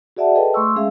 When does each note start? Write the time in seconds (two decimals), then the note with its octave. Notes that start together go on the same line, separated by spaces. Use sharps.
0.17 F#4 G#4 D5 E5 F#5 A5
0.35 G#4 A4 B4 D#5 G5 A5
0.54 A3 C6 C#6 E6
0.76 G#3 C#4 G#4 E5 F5